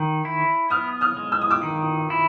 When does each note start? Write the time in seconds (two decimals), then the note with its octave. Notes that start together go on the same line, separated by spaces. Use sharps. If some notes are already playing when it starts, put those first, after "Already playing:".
Already playing: D#3
0.25 E4
0.70 B3 D#6 F6
1.01 D#6 F6
1.17 G#3
1.32 E6
1.41 D#6
1.50 D6 E6
1.63 D#3
2.10 E4